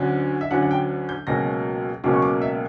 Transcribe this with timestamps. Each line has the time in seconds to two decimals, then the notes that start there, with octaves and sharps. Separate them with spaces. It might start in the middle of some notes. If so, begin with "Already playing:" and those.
Already playing: D2 D3 F#3 C#4
0.41 E5
0.51 D2 D3 F#3 C#4 F#5
0.63 F#5
0.71 G5
1.09 G6
1.27 C#2 B2 F#3 A#3 C#4 A#6
2.04 C#2 B2 F#3 A#3 C#4 D6
2.14 C#6
2.22 D6
2.42 E5